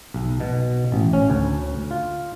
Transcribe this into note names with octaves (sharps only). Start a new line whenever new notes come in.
B1
B2
A1
C#4
D2
F4